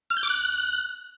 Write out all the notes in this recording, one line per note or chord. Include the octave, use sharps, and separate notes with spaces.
F6
G6
D6
F#6